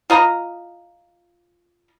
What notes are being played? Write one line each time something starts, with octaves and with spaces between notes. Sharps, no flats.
F4 D#5 A#5